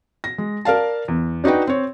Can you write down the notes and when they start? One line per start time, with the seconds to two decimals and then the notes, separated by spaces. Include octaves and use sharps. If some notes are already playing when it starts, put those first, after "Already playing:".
0.24 A#6
0.38 G#3
0.65 A#4 D5 F5 A5
1.08 E2
1.44 D4 D#4 F#4 B4 G5
1.67 C4 C#5